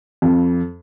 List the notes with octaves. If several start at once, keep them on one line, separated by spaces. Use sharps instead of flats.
F2